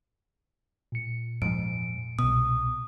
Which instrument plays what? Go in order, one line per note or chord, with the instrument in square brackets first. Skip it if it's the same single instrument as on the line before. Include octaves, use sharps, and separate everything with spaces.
[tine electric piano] A#2 C#7
[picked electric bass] F2 G#2 [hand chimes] D7
[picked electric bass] C2 B2 [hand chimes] D#6